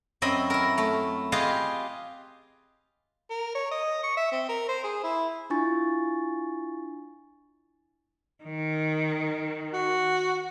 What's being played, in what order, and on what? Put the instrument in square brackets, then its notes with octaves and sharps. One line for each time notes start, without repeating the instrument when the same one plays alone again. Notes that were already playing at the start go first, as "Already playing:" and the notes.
[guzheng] F#2 C4 D#5 E5 B5
E4 A#4
A3
F4 G4 G#4 B4 D#5 F5
[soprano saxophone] A#4
C#5
D#5
C#6
E5
C4
A#4
C5
G#4
E4
[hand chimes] D4 E4 F4 G#5 C#6 A6
[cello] D#3
[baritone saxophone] F#4